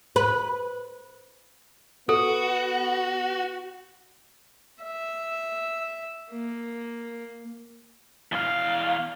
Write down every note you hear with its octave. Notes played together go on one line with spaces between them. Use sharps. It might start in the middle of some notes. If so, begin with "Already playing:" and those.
B4
B3 F#4 A4
E5
A#3
E2 F5